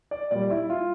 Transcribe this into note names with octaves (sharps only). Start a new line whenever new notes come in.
D5
A#2 G3 D5
E4
F4